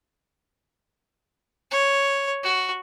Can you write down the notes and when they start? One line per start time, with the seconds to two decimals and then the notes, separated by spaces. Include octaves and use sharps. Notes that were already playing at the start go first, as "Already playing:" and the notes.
1.71 C#5
2.43 F#4